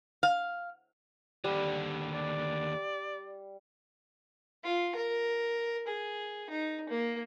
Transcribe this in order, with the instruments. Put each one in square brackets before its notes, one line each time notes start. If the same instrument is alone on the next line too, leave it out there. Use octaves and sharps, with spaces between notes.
[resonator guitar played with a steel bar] F5
[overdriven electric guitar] D#2 D3 [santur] G3
[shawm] D5
[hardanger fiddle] F4
A#4
G#4
D#4
A#3